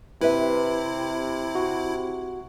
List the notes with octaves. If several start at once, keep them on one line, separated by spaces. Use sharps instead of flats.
C3 E4 B4 E5
F#4